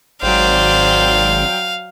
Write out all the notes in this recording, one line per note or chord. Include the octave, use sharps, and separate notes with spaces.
G#1 F#3 C5 D5 F5 G5